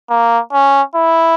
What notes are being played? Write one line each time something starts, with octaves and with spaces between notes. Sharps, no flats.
A#3
C#4
E4